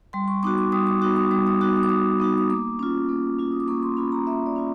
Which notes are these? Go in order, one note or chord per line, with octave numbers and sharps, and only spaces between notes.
G3 C6
C#6
B3 D#4 F#4 D6
D6
G3 D#6
D6
B3 D#4 F#4 D6
D#6
G3 D6
D#6
B3 D#4 F#4 D6
D#6
D6
G3 D#6
B3 D#4 F#4
D#6
A#3 D6
C#4 F4
A#3
C#4 F4
D#6
D6
A#3 C#6
C6
C#4 F4 B5
A#5
A#3 E5
D5
C#4 F4